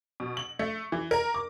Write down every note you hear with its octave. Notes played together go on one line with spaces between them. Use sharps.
B2
F#7
A3
E3
A#4
D6